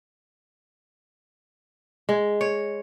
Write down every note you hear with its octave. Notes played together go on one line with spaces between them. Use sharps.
G#3
C#5